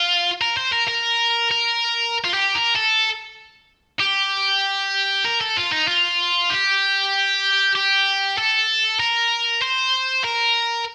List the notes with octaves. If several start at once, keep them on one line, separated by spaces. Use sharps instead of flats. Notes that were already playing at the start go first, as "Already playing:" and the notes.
Already playing: F4
A#4
C5
A#4
A#4
A#4
F4
G4
A#4
A4
G4
A#4
A4
F4
D#4
F4
G4
G4
A4
A#4
C5
A#4